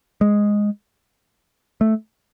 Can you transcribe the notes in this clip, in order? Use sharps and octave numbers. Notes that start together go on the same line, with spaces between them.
G#3
A3